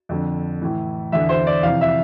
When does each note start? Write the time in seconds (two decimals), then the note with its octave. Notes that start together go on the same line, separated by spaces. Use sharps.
0.09 F2 D3
0.62 A2 E3
1.12 E2 D3 E5
1.29 C5
1.47 D5
1.63 F2 C3 E3 F5
1.81 E5